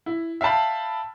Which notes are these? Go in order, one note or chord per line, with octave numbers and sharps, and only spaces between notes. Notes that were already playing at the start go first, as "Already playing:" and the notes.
E4
E5 F5 G5 A5 B5